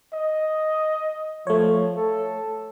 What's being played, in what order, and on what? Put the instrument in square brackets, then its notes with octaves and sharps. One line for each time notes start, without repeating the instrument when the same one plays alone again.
[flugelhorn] D#5
[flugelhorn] F3 [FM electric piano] A3 C#5
[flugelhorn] A4